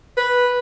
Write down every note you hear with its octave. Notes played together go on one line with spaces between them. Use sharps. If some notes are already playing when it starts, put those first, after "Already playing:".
B4